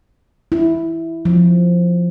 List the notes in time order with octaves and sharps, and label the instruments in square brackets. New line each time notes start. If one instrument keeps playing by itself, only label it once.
[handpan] E4
F3